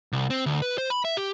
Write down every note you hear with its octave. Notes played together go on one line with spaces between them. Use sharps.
C2
C4
D2
B4
C5
B5
E5
G4